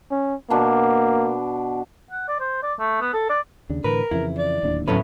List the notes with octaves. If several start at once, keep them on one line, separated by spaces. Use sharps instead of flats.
C#4
B2 A#3 D4
F#5
D5
C5
D5
A3
B3
A4
D5
D#2 C#3 D4
A2 D3 E3 A#4 B4
F2 C#3 E3 E4
D5
D1 D#2 D4
D2 A2 F#3 B3 C#4 A4 B4